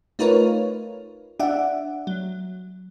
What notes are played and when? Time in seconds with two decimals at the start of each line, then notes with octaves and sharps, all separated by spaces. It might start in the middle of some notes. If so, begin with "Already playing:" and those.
0.19 A3 D#4 F4 A#4 B4 C#5
1.40 D4 D5 E5 F#5
2.07 F#3